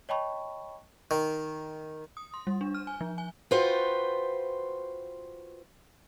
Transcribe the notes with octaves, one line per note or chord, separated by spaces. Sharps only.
C#5 D#5 G5 A5 B5 C#6
D#3
D#6
C6
G3
D4
F6
G#5
F3
G#5
F4 F#4 B4 C5 G5